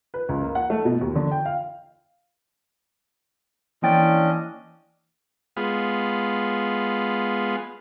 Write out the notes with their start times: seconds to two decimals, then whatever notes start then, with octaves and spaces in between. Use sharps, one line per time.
0.14 B4
0.29 C#2
0.42 A#3
0.55 F#5
0.70 A3
0.85 B2
1.01 D#2
1.15 D3
1.31 G5
1.45 F5
3.83 E3 A#3 C#4 D4 D#5 G5 A6
5.57 G#3 B3 F4